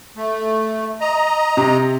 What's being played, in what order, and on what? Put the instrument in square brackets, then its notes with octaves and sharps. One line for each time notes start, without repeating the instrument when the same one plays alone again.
[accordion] A3
D#5 A#5
[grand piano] C3